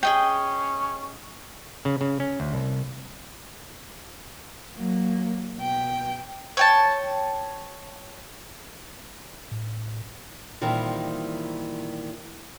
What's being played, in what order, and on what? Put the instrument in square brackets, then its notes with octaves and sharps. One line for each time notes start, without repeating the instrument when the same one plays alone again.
[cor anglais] C#4 [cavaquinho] G#4 D#5 G5
[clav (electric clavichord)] C#3
C#3
C#4
D2
C2
[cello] F#3 A#3
B2 G5
[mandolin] C#5 G5 A5
[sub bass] A2
[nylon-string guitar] A#2 D#3 E3 G3 C4